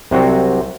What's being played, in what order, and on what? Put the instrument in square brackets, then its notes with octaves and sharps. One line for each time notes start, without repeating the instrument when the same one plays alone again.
[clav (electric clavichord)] C2 C3 F#3 C4 F#4